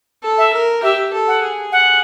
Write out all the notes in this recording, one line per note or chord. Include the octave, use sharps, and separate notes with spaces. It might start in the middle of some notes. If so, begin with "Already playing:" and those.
A4
E5
A#4
G4 E5
A4
F#5
G#4
F#5